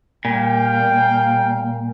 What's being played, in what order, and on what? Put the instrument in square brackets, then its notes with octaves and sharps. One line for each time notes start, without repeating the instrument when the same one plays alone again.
[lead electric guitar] A#2 [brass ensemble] G3 F5 G5